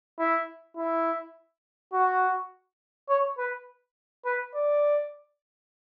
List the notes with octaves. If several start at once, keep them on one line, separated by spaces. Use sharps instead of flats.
E4
E4
F#4
C#5
B4
B4
D5